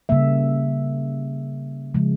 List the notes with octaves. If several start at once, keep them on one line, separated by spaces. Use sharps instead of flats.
C#3 G3 A#3 E5
C#3 F3 G#3